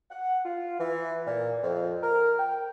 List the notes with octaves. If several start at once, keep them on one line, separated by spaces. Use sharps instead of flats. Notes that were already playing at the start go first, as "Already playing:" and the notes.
F#5
F4
E3
A#2
F2
A#4
G5